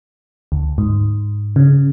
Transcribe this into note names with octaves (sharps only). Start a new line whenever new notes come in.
D2
G#2
C#3